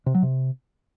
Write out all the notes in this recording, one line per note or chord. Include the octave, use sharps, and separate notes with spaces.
C3
F#3
C3